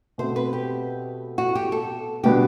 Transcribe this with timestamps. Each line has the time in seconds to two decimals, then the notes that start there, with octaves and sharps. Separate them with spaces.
0.18 B2 A3 C4 C5
0.36 B4
0.53 G4
1.38 F#4
1.55 G4
1.72 A4
2.24 B2 G3 B3 D4 G4